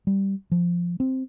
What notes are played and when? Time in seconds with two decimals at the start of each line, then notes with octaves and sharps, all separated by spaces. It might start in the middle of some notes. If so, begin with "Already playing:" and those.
0.07 G3
0.52 F3
1.00 C4